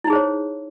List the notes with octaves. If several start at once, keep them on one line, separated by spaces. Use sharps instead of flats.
D#4 E4 G#4 C5 C#5